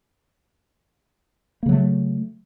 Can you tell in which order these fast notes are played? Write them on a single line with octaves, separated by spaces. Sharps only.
A#3 C#3 F#3 A3